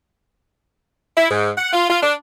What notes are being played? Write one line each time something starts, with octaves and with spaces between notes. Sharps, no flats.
E4
G#2
F#5
F4
F4
D4